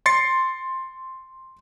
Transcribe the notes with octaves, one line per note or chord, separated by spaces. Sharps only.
C6 A6 C7 C#7